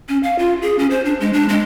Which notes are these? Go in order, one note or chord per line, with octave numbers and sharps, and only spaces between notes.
C#4
F5
F4
G#4
C#4
C5
D4
G#3
D4
G#3